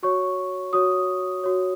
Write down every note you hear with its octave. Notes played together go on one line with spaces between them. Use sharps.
F#4 C#5 C#6
F#4 C#5 D#6
F#4 C#5